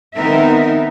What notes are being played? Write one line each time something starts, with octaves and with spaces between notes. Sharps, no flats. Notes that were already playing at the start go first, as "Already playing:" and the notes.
D#3 B3 C4 D#4 A#4 E5